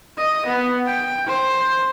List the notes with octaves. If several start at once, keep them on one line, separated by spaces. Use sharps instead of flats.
D#5
B3
G5
C5